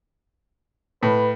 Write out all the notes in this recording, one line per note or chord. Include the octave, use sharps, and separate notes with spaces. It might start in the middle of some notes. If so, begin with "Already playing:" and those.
A2 B4